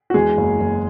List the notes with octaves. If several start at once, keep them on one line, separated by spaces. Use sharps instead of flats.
F#4
E2 G#3 G#4
F#1
F#1